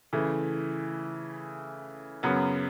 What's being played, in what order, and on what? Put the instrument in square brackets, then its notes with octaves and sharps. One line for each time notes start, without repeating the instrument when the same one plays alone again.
[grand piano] C#3 E3 A3
F#2 C#3 F#3 B3